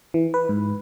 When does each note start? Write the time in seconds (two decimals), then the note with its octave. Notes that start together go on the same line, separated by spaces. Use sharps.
0.14 E3
0.34 B4
0.49 G#2